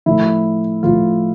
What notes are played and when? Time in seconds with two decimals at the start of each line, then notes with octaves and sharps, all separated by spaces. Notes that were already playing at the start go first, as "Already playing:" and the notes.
0.06 A2 F3 E4
0.83 A2 F3 F4